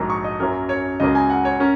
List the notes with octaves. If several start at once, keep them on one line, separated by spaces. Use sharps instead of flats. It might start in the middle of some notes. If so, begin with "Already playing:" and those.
Already playing: A#1 G#2 F#3 A#3 A#5
C#6
D#5
F#2 F#3 A#3 C#4 A#4
C#5
C#2 C#3 F#3 A#3 D#5
G#5
F#5
C#5
C#4 A#4